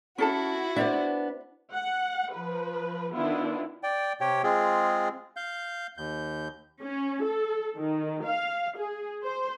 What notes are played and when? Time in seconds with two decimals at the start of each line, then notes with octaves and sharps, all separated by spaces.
0.18 C#4 E4 F#4 A4 A5
0.76 B3 D4 C5 D5 E5
1.72 F#5
2.33 F3 B4
3.14 D#3 B3 D4 E4 F4
3.83 D5 G5
4.21 C3 G4 C#5 G5
4.44 G#3 C4 F4 G#4
5.36 F5 G6
5.98 D#2 G6
6.82 C#4
7.23 A4
7.77 D#3
8.24 F5
8.77 G#4
9.23 C5